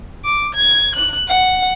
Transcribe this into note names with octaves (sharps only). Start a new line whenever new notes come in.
D6
G#6
F#6
F#5